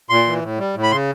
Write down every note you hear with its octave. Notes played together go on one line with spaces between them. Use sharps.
A#2 C6
E3
A2
G3
A2
B5
C#3 C6